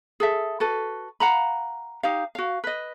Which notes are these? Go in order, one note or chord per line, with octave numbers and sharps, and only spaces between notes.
G#4 A4 E5
F#4 A4 B4
F5 F#5 A#5 B5
D#4 G4 F5
F#4 F5
B4 D#5